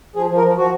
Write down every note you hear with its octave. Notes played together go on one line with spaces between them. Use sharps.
F3 G#4
F3
A#4
F3
F3 F#4